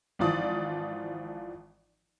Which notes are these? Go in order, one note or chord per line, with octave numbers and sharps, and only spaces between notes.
G#1 E3 F3 F4 D5 D#6